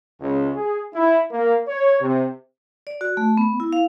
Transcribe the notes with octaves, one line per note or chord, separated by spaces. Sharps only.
C#2
G#4
E4
A#3
C#5
C3
D5
F#4
A3
B3
E4
F5